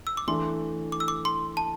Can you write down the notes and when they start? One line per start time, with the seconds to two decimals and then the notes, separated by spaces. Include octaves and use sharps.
0.07 E6
0.17 D6
0.27 E3 A3 D4 C6
0.92 D6
1.00 E6
1.08 D6
1.25 C6
1.57 A5